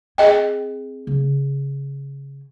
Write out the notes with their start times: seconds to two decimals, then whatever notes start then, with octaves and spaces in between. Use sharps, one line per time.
0.18 C4 G#4 D#5 G5
1.07 C#3